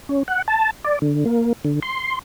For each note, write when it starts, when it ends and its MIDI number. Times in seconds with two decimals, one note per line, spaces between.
0.09 0.23 61
0.28 0.42 78
0.48 0.71 81
0.85 0.99 74
1.02 1.24 50
1.25 1.53 58
1.65 1.80 50
1.82 2.19 84